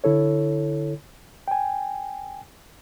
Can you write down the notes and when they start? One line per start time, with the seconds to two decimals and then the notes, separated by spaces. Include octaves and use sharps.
0.04 D3 E4 A4 C#5
1.48 G5 G#5